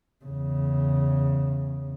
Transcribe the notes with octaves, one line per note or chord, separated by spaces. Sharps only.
E2 C#3